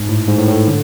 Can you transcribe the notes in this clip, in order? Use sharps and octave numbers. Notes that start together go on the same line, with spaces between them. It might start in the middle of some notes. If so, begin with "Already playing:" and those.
Already playing: G#2
A2
G#2
A2
A2
D3